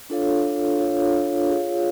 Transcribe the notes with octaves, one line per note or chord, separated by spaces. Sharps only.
D4 F4 A4 C#5 F5
D4 F4 A4 C#5 F5
F4 G#4 C#5 F5